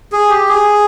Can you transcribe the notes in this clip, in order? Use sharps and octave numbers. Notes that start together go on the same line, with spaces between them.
G#4
G4
G#4